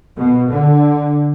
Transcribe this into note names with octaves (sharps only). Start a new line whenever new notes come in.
B2
D3